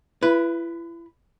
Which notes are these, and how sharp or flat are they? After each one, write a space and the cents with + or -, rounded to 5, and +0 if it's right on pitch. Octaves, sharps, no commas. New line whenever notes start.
E4 +35 B4 +0